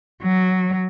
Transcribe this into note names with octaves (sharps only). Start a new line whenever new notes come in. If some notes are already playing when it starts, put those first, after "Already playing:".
F#3